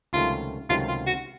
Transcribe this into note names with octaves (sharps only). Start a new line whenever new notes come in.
C#2 C3 D#3 F#3 A3 F4
C#2 C3 D#3 F#3 A3 F4
F4
F#4